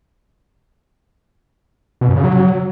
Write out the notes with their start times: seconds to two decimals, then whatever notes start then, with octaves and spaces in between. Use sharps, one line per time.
2.01 B2
2.09 F#2
2.16 C#3
2.24 F#3